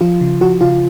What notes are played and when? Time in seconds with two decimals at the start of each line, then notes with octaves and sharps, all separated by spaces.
0.01 F3 F4
0.21 C#3
0.41 F3 F#4
0.61 C#3 F4